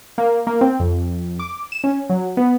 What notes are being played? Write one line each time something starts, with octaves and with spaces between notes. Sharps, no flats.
A#3
A#3
C4
F2
D6
E7
C#4
F#3
B3